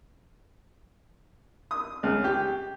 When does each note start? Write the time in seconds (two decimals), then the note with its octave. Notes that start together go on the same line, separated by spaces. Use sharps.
1.71 D#6
2.03 C#2
2.24 G4